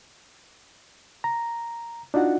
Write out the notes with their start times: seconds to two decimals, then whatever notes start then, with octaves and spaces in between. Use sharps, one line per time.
1.24 A#5
2.14 D4 D#4 F4 F#4 F#5